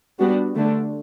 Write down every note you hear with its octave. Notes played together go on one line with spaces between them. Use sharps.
G3 B3 D4 F#4
D3 A3 D4